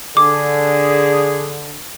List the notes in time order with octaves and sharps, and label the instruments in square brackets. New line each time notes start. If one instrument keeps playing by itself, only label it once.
[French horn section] D3 [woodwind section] G#4 [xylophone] D6